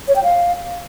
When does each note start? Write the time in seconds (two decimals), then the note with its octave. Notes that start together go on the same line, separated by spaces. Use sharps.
0.08 C#5
0.16 G5
0.23 F5